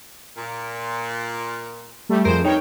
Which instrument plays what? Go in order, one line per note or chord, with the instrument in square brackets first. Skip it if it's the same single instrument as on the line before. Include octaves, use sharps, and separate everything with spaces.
[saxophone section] A#2
[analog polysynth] G3 A3
[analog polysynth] F2 [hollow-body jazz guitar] F3 G#4 A#4 [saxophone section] C5
[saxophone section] G2 [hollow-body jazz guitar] D#4 [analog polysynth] A#4 C#5 G5